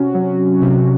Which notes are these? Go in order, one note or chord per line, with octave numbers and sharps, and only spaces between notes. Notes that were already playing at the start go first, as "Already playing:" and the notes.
Already playing: C3 C#4 F#4
F#3
C3